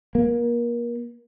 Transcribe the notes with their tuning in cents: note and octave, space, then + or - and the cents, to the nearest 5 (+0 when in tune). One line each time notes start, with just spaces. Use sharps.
A#3 +30